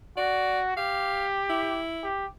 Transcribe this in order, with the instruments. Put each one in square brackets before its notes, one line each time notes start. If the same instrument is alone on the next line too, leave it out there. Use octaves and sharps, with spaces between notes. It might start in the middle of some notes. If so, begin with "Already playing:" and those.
[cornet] F#4 [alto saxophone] D5
[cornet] G4 [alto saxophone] F5
[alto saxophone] E4
[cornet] G4